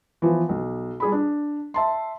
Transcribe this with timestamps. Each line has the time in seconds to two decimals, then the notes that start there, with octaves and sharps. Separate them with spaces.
0.22 E3 F3 B3
0.49 B1
1.00 G3 G#4 B5
1.12 D4
1.74 E5 A5 C6